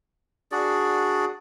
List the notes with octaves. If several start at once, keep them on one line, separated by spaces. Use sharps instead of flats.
D4 F#4 G#4 D5